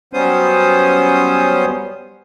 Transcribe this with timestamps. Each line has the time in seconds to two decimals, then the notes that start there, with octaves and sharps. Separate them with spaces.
0.13 F#3 G3 B3 C#4 C5 D#6